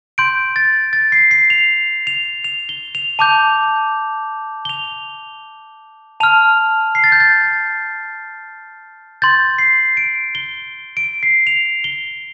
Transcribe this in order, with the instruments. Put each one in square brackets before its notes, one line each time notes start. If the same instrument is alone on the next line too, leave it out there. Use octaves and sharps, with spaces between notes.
[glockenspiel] C6 G6 D7
A6
A6
C7
C7
F7
F7
F7
G7
F7
A5 D6 G6 F7
G7
F7
A5 F6 F7
C7
A6
G6
A6
C6 G6 A6
C7
D7
G7
D7
C7
F7
G7